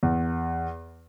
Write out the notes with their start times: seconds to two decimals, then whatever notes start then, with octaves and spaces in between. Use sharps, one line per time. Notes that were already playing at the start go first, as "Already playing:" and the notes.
0.03 E2